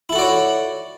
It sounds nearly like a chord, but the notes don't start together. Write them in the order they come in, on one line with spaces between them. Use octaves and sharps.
E4 A4 F#4 D5 C#5